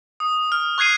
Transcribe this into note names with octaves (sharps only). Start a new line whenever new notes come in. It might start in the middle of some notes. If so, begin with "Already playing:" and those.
D#6
F6
C#6 F#6 G#6 C7 D#7